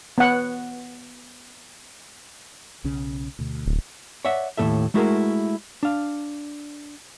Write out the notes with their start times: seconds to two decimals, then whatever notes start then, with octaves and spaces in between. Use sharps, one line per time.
0.18 B3 F#5
2.84 B1 C#3 C#4
3.39 D2 B2
3.66 D1
4.25 C#5 D5 E5 F#5
4.57 D#2 A2 E3 F3 A4 E5
4.94 G#3 A3 E4 F#4 G#4 A#4
5.83 D4 F5